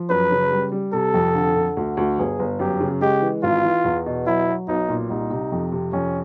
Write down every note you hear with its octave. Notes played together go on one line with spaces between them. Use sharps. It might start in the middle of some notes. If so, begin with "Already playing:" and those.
Already playing: F3
F#2 B4
C#3
G3
G3
C3 A4
F2
D3
D3
D2
D2
G1 G#4
G1
F#2 G4
C#3
G#3 G4
E3
G#1 F4
E3
E2
B2
F#3 E4
F#3
B1 D#4
A#2
C2 D#4
C3
F2
C3
F2 C#4